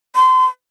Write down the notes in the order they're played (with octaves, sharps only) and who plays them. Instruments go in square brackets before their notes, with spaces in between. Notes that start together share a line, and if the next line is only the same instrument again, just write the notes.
[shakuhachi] C6